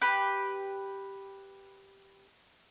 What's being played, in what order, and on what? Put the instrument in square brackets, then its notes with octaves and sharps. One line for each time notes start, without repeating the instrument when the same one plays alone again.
[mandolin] G4 B4